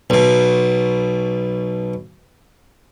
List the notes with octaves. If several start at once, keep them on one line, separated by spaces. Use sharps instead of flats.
B1 B2